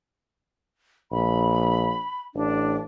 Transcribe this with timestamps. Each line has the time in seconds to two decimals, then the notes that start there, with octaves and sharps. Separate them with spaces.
1.12 A#1 B5
2.35 A1 D4